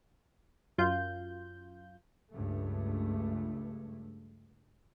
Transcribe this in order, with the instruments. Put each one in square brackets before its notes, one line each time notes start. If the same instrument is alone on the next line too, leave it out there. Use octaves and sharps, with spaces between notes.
[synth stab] F#2 F4 G6
[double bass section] C#2 G2 A3